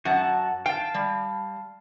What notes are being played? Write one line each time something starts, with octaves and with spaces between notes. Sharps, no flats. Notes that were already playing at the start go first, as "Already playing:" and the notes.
F#2 F#4 F#5 A5
F5 G5 A5
G3